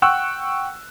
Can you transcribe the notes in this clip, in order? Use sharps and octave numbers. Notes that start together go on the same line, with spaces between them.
F#5 G5 C#6 E6 F#6